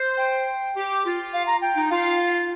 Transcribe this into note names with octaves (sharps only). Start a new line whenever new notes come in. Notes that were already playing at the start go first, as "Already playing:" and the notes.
Already playing: C5
G5
G4
F4
F5
A#5
G5
D#4
F4 F5